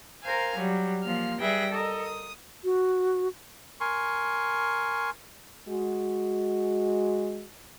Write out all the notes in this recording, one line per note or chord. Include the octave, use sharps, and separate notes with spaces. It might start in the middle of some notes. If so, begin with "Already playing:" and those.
A#4 C5 F5 G#5
F#3 G3
F3 A#3 F6
G3 G#4 B4 E5 G5 A#6
A4 A#4 D#5
D#6
F#4
A#4 G#5 C6 C#6
G#3 F#4